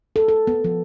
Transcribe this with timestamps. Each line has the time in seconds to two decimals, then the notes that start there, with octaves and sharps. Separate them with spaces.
0.16 A4
0.28 A4
0.47 B3
0.64 F3